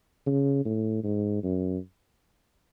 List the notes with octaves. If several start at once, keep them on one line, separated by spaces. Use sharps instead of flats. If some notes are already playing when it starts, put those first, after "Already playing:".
C#3
A2
G#2
F#2